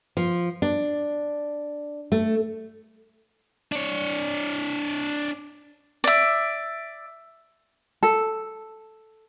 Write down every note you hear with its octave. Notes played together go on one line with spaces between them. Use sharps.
F3
D4
A3
D4 C#5
D5 E5
A4